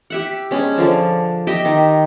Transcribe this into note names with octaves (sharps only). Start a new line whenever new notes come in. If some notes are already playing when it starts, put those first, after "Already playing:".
G4 E5 F#5
G#3 C#4 D4 G#4
D3 F3 D4
G4 D#5 E5 G5
D#3